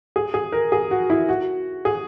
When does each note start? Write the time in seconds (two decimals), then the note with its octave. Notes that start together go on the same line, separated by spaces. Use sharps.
0.16 G#4
0.34 G#4
0.53 A#4
0.72 G#4
0.91 F#4
1.10 E4
1.29 F#4
1.85 G#4